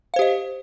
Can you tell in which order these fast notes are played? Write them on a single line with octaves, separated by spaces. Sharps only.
F5 C5 G4 D#5